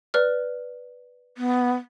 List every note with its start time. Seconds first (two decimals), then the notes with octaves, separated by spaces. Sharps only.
0.14 B4 D5 F6
1.38 B3